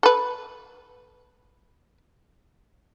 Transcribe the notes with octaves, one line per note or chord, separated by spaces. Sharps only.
A4 B4